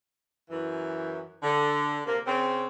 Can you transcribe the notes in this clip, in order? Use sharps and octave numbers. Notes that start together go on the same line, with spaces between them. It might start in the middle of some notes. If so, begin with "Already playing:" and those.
F#2 E3
D3
C3 A#3
C#3 C4